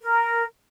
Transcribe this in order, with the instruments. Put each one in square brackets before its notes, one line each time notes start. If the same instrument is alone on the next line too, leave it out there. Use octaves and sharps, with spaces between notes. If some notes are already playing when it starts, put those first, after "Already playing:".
[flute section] A#4